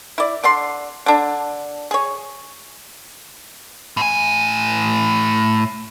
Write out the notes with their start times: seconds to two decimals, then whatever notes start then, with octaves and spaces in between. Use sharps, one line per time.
0.18 E4 D5
0.44 D3 D5 C6
1.06 D3 D4
1.91 G#4 C#5
3.97 A2 G#5